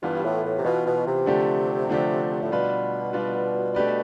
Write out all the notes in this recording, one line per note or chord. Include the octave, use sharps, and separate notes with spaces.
G2 E3 B3 F4
A2
A2
C3
B2 E3 B3 F4
B2
C3
D3 F3 A3 D4 G4
D3 F3 A3 D4 G4
A2
B2 G3 D4 F4 B4
G3 D4 F4 B4
A3 D4 G4 B4 D5